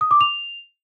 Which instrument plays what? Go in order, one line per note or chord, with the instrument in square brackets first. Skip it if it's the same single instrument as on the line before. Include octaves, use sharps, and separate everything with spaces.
[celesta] D#6
D6
F7